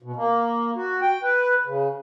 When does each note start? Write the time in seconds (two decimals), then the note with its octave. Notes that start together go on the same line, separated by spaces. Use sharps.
0.02 B2
0.16 A#3
0.76 F#4
1.02 G5
1.23 B4
1.66 C#3